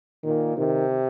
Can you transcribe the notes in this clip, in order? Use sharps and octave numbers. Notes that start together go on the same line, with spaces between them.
A#2 D#3
C3 D#3